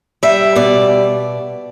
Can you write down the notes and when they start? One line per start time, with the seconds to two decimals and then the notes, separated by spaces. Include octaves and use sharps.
0.23 G3 E5
0.55 B2 D5